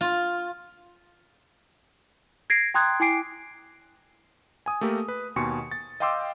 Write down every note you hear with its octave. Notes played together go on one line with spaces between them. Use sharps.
F4
G#6 A#6 C7 D7
G5 A#5 C6 D#6 F#6 G#6
E4 G5 G#5 D6 C7 D7
G#5 D#6
A3 A#3 G4 A4 A#4
B4
D#2 B2 G#5 C6 C#6 C#7
A6
D#5 F5 G5 C6 D6 E6